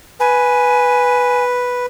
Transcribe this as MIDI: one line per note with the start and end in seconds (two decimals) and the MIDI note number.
0.20 1.86 71
0.20 1.44 80